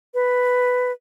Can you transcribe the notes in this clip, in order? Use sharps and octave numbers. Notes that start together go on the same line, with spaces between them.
B4